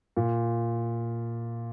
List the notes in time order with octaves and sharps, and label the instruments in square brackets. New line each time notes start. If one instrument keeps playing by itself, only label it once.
[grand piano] A#2